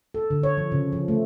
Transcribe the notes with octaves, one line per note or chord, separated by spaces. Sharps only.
A4
D3
C#5
F3
C#3
F3
A3